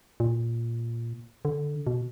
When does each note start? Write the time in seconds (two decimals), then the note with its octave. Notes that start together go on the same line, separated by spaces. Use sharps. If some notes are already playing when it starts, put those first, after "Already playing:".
0.20 A#2
1.45 D3
1.87 B2